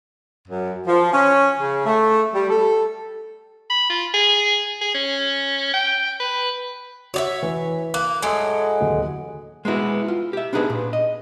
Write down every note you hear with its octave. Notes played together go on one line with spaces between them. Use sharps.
F#2
F3
C#4
C#3
A3
G3
A4
B5
F4
G#4
G#4
C#4
G5
B4
F#4 C#5 D5 E5
E3
A#3 F#6
A2 F#3 G#3 A4 D#6 D7
D1 D#2
G#3 A#3 B3 E4 F#4
F4
G4 E5
B3 D4 D#4 G#4 B4 C5
A#2
D#5